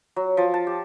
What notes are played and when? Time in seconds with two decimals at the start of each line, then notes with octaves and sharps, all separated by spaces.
0.16 F#3
0.37 F3
0.54 A5
0.67 G4